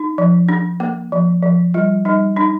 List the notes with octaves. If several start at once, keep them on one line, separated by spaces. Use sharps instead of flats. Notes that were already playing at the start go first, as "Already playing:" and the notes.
Already playing: D#4
F3
D4
A#3
F3
F3
G3 F4
G3 D#4
D4 D#4